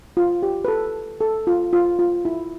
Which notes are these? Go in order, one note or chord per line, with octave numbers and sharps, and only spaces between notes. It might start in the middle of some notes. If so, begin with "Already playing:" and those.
F4
G4
B4
A4
A4
F4
F4
F4
E4